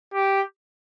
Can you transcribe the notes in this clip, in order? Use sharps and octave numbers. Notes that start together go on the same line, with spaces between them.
G4